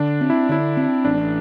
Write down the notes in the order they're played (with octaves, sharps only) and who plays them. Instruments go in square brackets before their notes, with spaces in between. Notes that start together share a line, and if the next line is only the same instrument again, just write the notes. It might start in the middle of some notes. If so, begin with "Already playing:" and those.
Already playing: [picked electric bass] D3 [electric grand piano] D4
[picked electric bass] C4
[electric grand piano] E4
[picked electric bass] D3 [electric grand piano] E4
[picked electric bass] C4
[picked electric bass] A1 [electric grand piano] D4